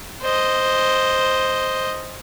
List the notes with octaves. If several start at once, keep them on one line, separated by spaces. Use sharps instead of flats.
C5 D#5